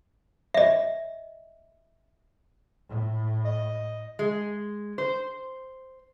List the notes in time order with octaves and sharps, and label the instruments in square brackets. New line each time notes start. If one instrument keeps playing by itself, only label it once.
[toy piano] D#5 E5
[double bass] A2
[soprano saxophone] D#5
[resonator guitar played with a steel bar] G#3
C5